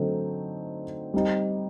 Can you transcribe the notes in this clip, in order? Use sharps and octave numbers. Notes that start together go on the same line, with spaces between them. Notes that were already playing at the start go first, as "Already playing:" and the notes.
Already playing: D3 F#3 A3 C4 D#4
G3 C4 D#4